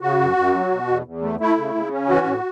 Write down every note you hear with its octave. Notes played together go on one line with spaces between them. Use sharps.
C#3 F#4
F#2
F#2
F#3
B2
E2
E2
A3
A3 E4
C#3
C#3
C#4
E3 F#4
A2